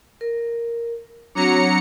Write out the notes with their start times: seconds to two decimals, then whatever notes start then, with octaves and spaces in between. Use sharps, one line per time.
0.21 A#4
1.35 F#3 C4 D4 A#5 C#7